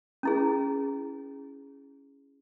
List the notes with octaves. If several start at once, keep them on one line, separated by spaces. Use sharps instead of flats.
C#4 E4 G#4